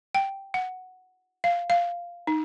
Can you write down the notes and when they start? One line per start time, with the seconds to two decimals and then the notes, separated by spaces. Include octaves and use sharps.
0.15 G5
0.54 F#5
1.44 F5
1.70 F5
2.27 D#4